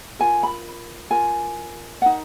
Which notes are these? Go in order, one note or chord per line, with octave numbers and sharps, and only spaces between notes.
F4 A#4 G#5
B5
F4 A#4 G#5
D#4 A#4 F#5